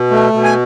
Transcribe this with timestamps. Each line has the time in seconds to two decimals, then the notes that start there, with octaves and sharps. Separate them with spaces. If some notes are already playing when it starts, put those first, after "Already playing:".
Already playing: B2
0.11 A3
0.33 B2
0.44 G#5